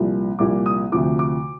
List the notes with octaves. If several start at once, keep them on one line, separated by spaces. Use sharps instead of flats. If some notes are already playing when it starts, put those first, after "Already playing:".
Already playing: C2 A#2 F3
C2 A#2 F3 D6
D#6
D2 C3 F3 D6
D6